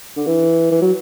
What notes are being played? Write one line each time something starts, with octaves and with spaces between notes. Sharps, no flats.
D3
E3
E3
F#3